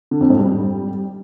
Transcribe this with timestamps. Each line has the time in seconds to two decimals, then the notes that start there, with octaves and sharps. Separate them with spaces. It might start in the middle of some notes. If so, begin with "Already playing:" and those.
0.11 D3
0.21 F2
0.30 G#2
0.39 G3